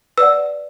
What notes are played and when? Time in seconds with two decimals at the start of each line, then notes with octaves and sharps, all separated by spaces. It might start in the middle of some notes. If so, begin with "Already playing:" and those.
0.18 B4 D5 F#5 E6